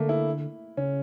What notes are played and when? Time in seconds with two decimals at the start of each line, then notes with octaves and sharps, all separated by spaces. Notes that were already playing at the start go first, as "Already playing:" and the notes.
Already playing: D3 A3 A#3
0.09 E4
0.77 C#3 C#4